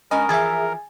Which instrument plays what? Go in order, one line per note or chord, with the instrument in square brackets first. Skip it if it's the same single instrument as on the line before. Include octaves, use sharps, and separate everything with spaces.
[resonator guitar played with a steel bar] G#3 C#4 G#5 [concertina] A#4 [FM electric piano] D#5 [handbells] B5
[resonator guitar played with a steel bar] E3 F3 [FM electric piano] G#4 E5 [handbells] G#5 G#6 A6